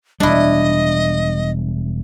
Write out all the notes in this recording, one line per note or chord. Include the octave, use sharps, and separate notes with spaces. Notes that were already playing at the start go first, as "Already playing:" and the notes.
E1 G3 D4 E4 D#5